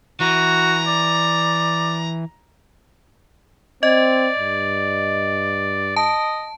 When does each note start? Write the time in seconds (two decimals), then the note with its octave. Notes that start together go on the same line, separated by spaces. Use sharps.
0.20 E3 F#4 A#5
0.87 D5
3.83 C4 D5 D#5
4.38 G2
5.96 D#5 A5